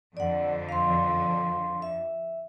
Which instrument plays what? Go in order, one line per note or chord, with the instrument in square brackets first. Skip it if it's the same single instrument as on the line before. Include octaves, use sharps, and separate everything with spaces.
[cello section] F2 D3 [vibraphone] D5 F#5
[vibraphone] F5 C6
E5